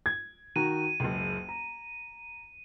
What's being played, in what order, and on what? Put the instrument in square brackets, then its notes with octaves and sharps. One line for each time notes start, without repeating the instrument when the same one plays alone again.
[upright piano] G#6
[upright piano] D#3 F#4 A#5 [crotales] D#7
[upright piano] F#1 C#2
A#5